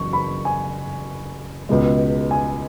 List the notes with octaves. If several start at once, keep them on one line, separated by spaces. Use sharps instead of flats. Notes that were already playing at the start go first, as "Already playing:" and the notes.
Already playing: F#1 E2 F#3 C#6
B5
G#5
C#2 B2 G#3
G#5